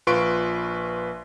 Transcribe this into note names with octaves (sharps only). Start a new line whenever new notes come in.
A#1 F4 B4 C6 C#6 D7